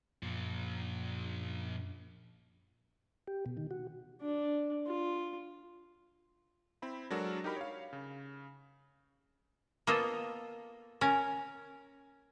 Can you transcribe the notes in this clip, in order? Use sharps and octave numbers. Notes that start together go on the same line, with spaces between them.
F#2 A#2 F3
G4
B2
D#3
F#4
D4
F4
C4 E4 B5
F#3 G#3 D4 F#4 A4 A#4
D#4 G4 A#4 B5
C#5 F5
C#3
A#3 B3 F4 A4 D#5
C#4 A#4